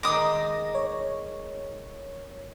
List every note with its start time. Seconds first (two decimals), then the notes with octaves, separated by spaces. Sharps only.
0.03 D#3 G#3 D#4 D6 D#6 A#6
0.75 C#5